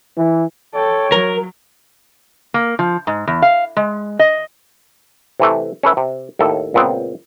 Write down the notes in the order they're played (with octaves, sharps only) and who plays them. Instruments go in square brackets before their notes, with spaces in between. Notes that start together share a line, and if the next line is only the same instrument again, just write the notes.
[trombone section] E3
[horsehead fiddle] A4 G5 [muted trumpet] C#5
[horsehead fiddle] F#3 [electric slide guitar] A#4
[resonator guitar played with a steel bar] A#3
F3
G#2
E2
F5
G#3
D#5
[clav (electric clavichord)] C3 E3 A3
C#4 A4 B4 E5
C3
D#2 A2 A4
C#2 A#2 B3 C4